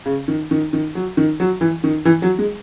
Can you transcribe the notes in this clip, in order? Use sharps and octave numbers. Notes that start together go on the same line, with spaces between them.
C#3
D#3
D#3
D#3
F#3
D#3
F#3
E3
D#3
E3
F#3
G#3